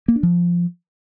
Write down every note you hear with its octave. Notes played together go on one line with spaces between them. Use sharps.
A#3
D4
F3